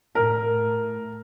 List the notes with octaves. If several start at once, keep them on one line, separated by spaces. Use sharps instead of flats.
A2 A#4